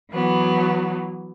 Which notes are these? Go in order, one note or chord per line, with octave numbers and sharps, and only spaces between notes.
E3 F#3 B3